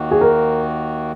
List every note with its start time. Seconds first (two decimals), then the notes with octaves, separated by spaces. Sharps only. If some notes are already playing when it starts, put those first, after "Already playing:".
Already playing: D#2 D#3 A#3 F#4
0.11 G#4
0.21 A#4